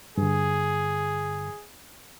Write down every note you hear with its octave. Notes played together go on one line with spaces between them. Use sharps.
G2 D3 G#4